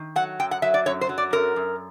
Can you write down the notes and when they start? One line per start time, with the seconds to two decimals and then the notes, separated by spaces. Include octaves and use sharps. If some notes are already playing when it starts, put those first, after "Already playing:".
Already playing: D#3
0.16 F#3 F#5
0.40 F#2 G5
0.51 F#5
0.62 F#3 E5
0.74 D5
0.86 F#2 C#5
1.01 C5
1.09 F#3
1.18 D5
1.33 F#2 A#4
1.56 F#2